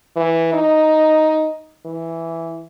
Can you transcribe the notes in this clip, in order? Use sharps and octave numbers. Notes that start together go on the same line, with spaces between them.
E3
D#4
E3